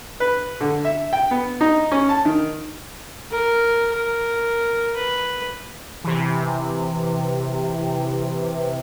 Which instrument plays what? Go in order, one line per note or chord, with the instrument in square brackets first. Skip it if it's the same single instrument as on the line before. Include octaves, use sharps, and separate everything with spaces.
[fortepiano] B4
D3
E5
G5
B3
D#4
C#4
A5
D#3
[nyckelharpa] A#4
A#4
B4
[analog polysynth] C3 E3